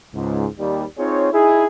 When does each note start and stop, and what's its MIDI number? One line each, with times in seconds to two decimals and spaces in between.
0.15 0.46 37
0.15 0.46 44
0.59 0.85 39
0.59 0.85 55
0.98 1.29 60
0.98 1.29 63
0.98 1.29 65
0.98 1.29 68
0.98 1.29 73
1.33 1.66 63
1.33 1.66 64
1.33 1.66 68